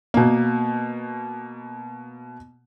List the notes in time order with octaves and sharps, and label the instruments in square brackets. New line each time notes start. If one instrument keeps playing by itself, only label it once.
[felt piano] B2 A#3